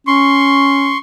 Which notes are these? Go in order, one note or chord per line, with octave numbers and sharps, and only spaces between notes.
C#4 C6 C#6